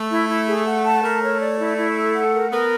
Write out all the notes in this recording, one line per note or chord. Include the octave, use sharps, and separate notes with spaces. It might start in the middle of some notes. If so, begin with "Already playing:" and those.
Already playing: A3
E4
E4
G#4
F#5
A5
A3 A#4
C#5
D5
E4
E4
A4
F#5
A#4
B3 A#4